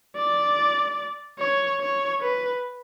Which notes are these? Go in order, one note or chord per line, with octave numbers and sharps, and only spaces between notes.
D5
C#5
C#5
B4